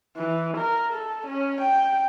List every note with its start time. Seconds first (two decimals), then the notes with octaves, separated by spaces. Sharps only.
0.17 E3
0.57 A#4
0.93 A4
1.27 C#4
1.61 G5